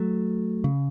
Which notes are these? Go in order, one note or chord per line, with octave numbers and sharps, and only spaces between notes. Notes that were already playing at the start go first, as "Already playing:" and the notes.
Already playing: F#3 A3
C#3